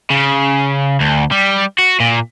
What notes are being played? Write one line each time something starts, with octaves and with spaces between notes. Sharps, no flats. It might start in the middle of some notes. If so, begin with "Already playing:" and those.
C#3
D2
G3
F#4
A#2